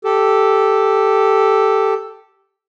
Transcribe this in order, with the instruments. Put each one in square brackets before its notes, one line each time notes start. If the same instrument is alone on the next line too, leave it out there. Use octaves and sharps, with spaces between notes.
[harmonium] G4 A4